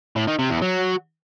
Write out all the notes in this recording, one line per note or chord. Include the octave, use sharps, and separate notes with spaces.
A2
D#3
C3
E2
F#3